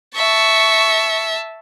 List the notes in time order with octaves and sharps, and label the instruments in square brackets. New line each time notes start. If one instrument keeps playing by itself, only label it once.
[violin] E5 A5 [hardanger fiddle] C#6